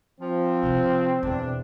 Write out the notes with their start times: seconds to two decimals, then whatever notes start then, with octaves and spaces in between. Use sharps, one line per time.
0.20 F3 C4
0.63 C3 E4
1.23 E2 B2 D4